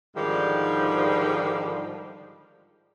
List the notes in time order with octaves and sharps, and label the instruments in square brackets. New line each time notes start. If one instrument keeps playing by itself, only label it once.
[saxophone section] G#2 D3 D#3 F3 G3